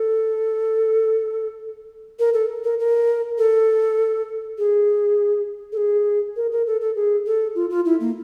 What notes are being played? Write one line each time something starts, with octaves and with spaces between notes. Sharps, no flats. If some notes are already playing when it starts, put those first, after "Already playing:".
Already playing: A4
A#4
A4
A#4
A#4
A4
G#4
A4
G#4
A#4
A#4
A4
A4
G#4
A4
F4
F4
E4
A#3